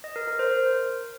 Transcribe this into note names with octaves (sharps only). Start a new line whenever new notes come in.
D#5
A#4
A#4
C5
A#4